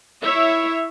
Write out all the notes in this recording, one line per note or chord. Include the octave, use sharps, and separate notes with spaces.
E4 C#5 E5